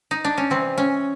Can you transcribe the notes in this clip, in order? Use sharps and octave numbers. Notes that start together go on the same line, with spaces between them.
D#4
D4
C#4
C3 E3 G3 C4
C#4